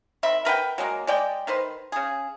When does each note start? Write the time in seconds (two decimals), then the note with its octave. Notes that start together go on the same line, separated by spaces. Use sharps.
0.23 D#3 C4 E5 B5
0.45 A#4 B4 F#5 G5
0.78 F#3 G#3 A#3
1.07 G#3 D5 G5
1.47 D#3 B4 C5
1.92 C#3 G#4